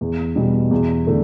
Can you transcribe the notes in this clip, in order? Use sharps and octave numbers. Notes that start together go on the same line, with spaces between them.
E2
B2 G3
E2
D3 A3